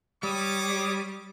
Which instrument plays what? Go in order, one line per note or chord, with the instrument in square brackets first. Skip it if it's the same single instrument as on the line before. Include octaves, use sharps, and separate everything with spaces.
[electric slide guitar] G3 [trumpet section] C#5 D6 D#6